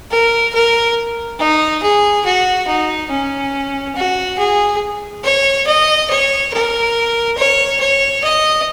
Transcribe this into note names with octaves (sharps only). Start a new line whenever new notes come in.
A#4
A#4
D#4
G#4
F#4
D#4
C#4
F#4
G#4
C#5
D#5
C#5
A#4
C#5
C#5
D#5